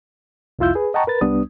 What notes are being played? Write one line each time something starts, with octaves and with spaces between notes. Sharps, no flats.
C2 F2 E4 F4 E6 G6
G#4 B4
D#5 F#5 G5 A5 A#5 C#6
A#4 B4 A6
C2 G3 B3 D4 D#6